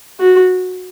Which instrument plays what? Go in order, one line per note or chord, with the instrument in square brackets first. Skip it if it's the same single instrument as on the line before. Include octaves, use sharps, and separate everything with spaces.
[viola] F#4